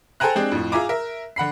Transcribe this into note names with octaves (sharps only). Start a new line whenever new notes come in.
A4 C5 G5 G#5 A#5 F#6
G#3 C4 D4 G4 G#4
F2 A2
F4 G#4 E5 G#5 A#5 D6
A#4 E5
D3 F#5 B5 C7